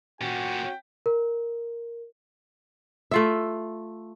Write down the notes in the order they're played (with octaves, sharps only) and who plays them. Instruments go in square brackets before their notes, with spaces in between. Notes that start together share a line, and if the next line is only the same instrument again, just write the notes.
[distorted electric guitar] A#2 C#4 [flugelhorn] F#4 [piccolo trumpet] G5
[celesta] A#4
[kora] A3 F4 E5